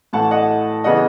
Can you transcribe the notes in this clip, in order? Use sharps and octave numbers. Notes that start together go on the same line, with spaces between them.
A2 E3 A3 F#5 A5
D#5 F#5
C#3 E3 B3 D#5 F#5